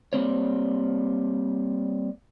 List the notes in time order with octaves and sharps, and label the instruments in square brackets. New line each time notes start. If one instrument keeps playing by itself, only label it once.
[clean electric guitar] G3 A#3 C4 C#5